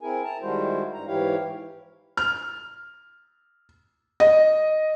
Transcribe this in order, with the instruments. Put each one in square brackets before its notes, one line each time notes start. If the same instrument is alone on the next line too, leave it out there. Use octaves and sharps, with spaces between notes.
[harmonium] C4 E4 G#4 A#4 G#5
A5 A#5
D#3 G3 G#3 E4 F#4 C5
G2 A#5
G#2 E3 E4 G4 C#5 F5
[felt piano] F6
D#5